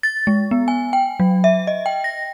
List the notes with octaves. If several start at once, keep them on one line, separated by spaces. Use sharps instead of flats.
A6
G#3
B3
G#5
G5
F#3
E5
D#5
G5
A#6